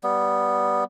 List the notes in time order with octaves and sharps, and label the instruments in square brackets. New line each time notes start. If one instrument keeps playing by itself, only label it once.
[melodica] G3 B3